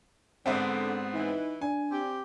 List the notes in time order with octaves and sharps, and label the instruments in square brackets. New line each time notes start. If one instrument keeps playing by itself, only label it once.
[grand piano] G#2 B3 C4 [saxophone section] D3
[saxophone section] E3 [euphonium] D#4
[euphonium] D4 [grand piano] G#5
[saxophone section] C4 G4